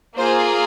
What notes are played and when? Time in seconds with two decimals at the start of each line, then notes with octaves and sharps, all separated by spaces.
0.18 A#3 F4 G#4 C5